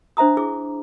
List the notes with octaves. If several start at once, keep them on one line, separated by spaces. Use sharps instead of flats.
D4 C5 E5 A#5 D#6
E4 G#4 D6